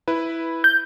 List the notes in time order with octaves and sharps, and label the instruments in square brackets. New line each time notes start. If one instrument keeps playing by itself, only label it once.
[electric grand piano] E4 B4
[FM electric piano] G6